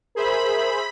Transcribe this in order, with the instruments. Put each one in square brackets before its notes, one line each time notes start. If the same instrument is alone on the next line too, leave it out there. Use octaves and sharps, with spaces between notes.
[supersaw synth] G#4 C5 E5 [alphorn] A#4 [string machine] B5